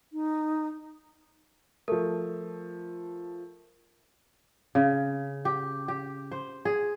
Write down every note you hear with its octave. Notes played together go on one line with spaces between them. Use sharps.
D#4
F3 A3 A#4
C#3
G4
G4
C5
G#4